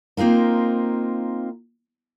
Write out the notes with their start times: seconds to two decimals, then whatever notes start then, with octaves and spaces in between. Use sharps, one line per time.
0.17 A#3 C4 D#4 F4 A#4